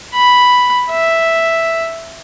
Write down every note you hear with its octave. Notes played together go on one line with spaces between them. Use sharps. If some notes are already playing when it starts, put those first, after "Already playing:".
B5
E5